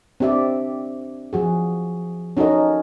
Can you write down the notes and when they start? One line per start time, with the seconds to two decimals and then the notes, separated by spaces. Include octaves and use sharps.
0.20 C4 D4 G4 D5 E5
1.33 F3 F#4 G#4
2.37 C#4 D#4 F#4 A4 A#4 D#5